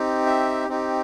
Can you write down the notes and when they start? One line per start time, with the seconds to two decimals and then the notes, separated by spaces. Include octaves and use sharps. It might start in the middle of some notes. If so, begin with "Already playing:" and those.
Already playing: C4 D#4 G4
0.26 E5
0.69 C4 D#4 G4